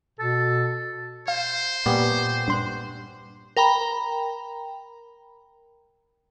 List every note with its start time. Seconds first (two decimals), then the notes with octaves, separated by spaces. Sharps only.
0.19 B2 A4
1.28 C5 F5
1.86 A#2 G3 B3 C#4
2.48 G2 C6 F#6
3.57 A#4 G5 A#5 B5